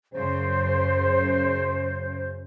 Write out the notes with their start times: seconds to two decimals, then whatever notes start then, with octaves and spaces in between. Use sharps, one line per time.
0.14 F#2 C#3 C5